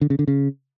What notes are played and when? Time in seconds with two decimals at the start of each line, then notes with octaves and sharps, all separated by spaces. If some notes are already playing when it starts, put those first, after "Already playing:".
0.01 D3
0.10 C#3
0.19 D3
0.28 C#3